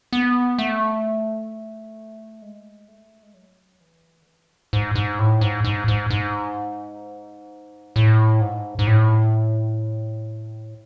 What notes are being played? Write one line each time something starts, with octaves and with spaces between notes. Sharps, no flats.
B3
A3
G#3
A3
G#3
F#3
E3
D3
E3
G#2
G#2
A2
G#2
G#2
G#2
G#2
A2
G#2
G#2
A2